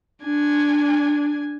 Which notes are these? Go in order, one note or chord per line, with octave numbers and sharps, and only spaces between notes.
D4 G#5